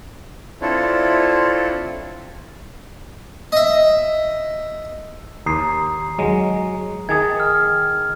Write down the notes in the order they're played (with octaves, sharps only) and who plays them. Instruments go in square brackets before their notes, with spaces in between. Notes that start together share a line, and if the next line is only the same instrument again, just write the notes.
[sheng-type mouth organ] C4 D4 E4 F4 A4 C#5
[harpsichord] D#5 E5
[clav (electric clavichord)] D#2 [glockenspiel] A#5 D#6 C7
[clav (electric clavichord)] F#3 G#3
[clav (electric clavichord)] D#3 G#4 A5 [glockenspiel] D#6 G#6
[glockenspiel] F6